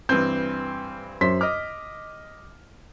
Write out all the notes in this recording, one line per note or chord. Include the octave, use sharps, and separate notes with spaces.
G2 E3 C4 G6
F#2 C5 C6 B6
D#5 D6 F6